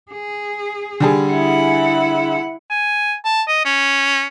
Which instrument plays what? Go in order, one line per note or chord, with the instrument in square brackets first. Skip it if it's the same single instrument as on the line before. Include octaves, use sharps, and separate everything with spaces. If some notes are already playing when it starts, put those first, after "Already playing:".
[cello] G#4
[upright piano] D3 G3 G#4
[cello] E4 F#5
[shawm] G#5
A5
D#5
C#4